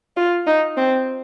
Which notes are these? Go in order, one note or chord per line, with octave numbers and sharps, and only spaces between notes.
F4
D#4
C4